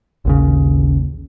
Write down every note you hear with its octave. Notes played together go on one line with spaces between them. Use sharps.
A1 D#2 C#3